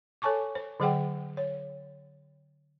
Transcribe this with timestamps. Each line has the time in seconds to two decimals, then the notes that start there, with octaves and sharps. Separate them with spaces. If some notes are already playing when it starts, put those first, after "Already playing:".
0.22 A4 C#5 G#5 A5 C#6 D6
0.55 C5
0.80 D3 F#3 G#4 C5 F#5 G5
1.37 C#5